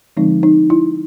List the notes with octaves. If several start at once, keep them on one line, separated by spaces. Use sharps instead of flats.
D3 F3 G#3 C4 D#4
D#4
E4